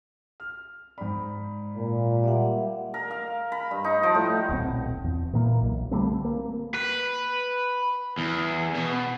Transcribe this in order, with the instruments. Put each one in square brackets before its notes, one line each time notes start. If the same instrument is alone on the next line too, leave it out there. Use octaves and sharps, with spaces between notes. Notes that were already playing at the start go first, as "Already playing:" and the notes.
[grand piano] F6
[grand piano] G#2 B5 [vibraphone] D5
[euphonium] A#2
[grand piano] G3 [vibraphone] D5 E5 F#5
[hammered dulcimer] A#4
F5
B5
G2
D#4
F3
A2
[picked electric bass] D#1 B1 B3 C4
E2
A#2 E3 A#3
B1
D3 G3 A3 C4
A#3
[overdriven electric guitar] B4
E2
B2